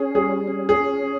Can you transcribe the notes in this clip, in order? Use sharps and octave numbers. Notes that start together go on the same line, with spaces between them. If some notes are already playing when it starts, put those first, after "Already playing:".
Already playing: C#4 G#4
G3 G#4
C#4
G#4
C#4